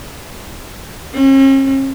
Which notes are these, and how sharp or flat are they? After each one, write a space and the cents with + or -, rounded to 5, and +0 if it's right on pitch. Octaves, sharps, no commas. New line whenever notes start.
C#4 -45